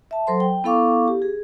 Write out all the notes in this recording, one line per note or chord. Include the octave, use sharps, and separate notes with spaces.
E5 A5
F#3 A4 C5 C6
G5
B3 E4 A4 F5 C#6 D6
G4
G#4